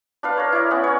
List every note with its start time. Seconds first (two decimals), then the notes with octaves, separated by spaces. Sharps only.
0.23 D4 B4 F5
0.37 A#4 C#5
0.52 E4 D5
0.71 B3 C#4 F#5
0.84 A#4 C#5